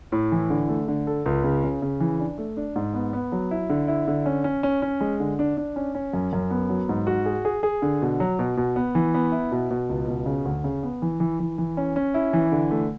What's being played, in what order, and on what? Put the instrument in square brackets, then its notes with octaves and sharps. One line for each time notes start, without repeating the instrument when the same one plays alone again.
[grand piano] A2
E3
D3
A3
D3
A4
C#2
C#3
C#3
C#3
E3
D4
A3
D4
G#2
B3
B3
F#3
E4
D3
E4
D3
C#4
C#4
C#4
C#4
G#3
D3
D4
D4
C#4
C#4
F#2
F#2
B3
F#3
G#2
F#4
G#4
G#4
G#4
D3
B2
F#3
B2
B2
B3
E3
B3
E4
B2
B2
C#2
B2
C#3
D2
C#3
B3
E3
E3
E3
E3
C#4
C#4
E4
E3
D3
A3